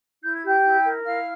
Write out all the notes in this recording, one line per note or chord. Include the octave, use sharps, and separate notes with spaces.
E4 G6
G#6
G4 G5 G6
E4
A#4
E4 F5 F6